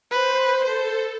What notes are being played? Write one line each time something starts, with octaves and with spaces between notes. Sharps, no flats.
B4 C5
A4 C5